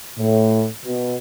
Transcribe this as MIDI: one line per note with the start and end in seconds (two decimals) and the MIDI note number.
0.18 0.67 45
0.85 1.15 47